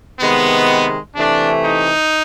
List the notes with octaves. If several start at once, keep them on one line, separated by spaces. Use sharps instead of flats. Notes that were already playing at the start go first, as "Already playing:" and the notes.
C3 D#3 G#3 B3
C3 E3 A3 D4
D#4